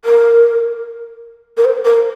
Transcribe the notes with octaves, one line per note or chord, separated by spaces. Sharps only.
A#4
A#4
C5
A#4